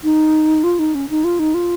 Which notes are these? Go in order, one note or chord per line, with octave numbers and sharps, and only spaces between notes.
D#4
F4
D#4
C#4
D#4
F4
D#4
F4